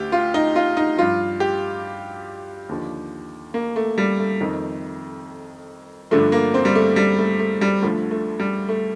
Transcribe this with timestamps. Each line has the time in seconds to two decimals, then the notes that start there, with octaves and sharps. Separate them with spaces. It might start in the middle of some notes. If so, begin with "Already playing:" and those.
Already playing: D2 G4
0.12 F4
0.34 D#4
0.56 F4
0.77 D#4
0.97 G2 F3 F4
1.40 G4
2.69 D#2 D3 F3
3.54 A#3
3.76 A3
3.98 G3
4.19 A3
4.40 F2 D#3
6.11 G2 D3 F3 A3
6.32 A#3
6.54 C4
6.65 G3
6.75 A3
6.96 G3
7.19 A3
7.39 A3
7.61 G3
7.82 D2 D3 F3 A3
8.11 A3
8.40 G3
8.69 A3